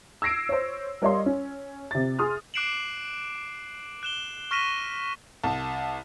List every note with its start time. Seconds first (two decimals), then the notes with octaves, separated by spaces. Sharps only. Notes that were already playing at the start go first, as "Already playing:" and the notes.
0.22 E6 G#6 A#6 C7 D7
0.49 C5 C#5
1.02 G3 A#4 C#5 D#5 F5 C6
1.26 C#4
1.91 C3 A6
2.19 G#4 C6 D#6 F6
2.54 D6 F#6 C7 D7 E7 F#7
4.03 F#6 E7 G7
4.51 C#6 F6 A#6 B6 D#7 E7
5.43 C2 A5